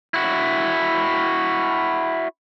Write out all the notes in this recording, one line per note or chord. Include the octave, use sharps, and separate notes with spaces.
E4 F#4